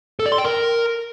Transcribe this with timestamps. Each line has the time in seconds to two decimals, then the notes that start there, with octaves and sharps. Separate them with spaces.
0.19 A4
0.26 D5
0.32 C6
0.38 G5
0.44 A#4